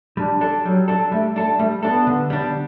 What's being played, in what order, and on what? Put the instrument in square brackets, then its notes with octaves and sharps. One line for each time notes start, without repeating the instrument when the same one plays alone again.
[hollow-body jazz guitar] G3 [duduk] D4
[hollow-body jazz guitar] D4 A4
[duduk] F#3 [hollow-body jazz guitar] G3
[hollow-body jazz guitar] D4 A4
[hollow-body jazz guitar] G3 [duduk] A3
[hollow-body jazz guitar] D4 A4
[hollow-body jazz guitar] G3 [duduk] A3
[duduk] B3 [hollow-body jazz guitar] D4 A4
[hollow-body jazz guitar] D3
G3 D4